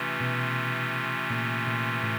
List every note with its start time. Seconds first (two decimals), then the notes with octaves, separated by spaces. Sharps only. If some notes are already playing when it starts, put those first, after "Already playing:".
Already playing: C3 E3 A3 C#4 F4
0.20 B2
1.30 A#2
1.67 A#2
2.03 A2